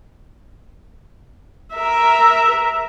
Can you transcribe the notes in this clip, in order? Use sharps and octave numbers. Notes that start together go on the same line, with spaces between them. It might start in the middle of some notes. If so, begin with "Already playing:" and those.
A#4 E5